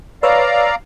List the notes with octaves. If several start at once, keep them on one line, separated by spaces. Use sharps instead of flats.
B4 C#5 D5 F5 A#5 E6